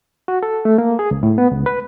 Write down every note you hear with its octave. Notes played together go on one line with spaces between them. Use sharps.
F#4
A4
A3
A#3
G#4
C#2
A2
B3
C#2
B4